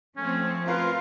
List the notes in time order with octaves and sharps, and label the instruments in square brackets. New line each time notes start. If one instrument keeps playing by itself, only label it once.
[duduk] F3 [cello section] A3 C4 [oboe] C#4
[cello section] F4 [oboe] A#4 [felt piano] B4 F5 C6